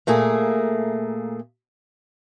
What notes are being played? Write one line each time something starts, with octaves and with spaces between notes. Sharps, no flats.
A#2 A3 A#3 G#4